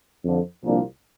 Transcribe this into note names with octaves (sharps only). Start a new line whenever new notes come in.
F2 D3 F3
C2 A#2 F3 A#3 D4